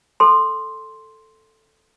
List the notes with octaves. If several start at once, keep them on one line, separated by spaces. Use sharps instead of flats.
A4 C6